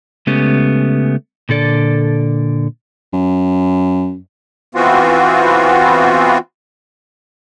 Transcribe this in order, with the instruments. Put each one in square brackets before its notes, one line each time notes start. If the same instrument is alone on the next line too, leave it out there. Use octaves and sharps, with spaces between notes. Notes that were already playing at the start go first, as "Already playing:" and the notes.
[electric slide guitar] C#3 G#3 A3 B3 C#4 G4
A#2 D3 A4 D5
[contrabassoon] F#2
[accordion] E3 B3 C4 F4 F#4